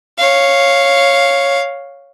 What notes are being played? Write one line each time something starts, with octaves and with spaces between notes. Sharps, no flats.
C#5 F5